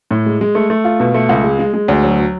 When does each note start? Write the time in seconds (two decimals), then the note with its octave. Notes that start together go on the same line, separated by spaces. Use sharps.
0.11 A2
0.26 G#3
0.41 G#3
0.55 A3
0.70 A3
0.85 F4
1.00 B2
1.14 A3
1.29 C#2
1.44 G#3
1.59 G#3
1.74 G#3
1.88 D2
2.03 F#3
2.18 F#3